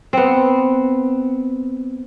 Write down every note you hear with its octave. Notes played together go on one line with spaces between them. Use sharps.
B3 C4